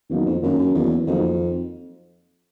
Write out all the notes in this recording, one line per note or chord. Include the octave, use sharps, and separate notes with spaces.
E2 D#3 F#3 A#3 D#4
F2
F#2 D#3 F#3 A#3 D#4
F#2
E2 D#3 F#3 A#3 D#4
F2 D#3 F#3 A#3 D#4